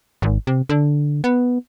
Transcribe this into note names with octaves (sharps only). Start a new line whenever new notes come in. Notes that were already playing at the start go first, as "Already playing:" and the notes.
G#1
C3
D3
B3